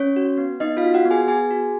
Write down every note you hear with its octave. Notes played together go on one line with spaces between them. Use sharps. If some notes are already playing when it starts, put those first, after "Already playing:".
Already playing: C#4 C#5
F#4
B3
B3 D#4 D#5
F4 F5
F#4
F#4 F#5
B3
G#4 G#5
B3 G#4 G#5
F#4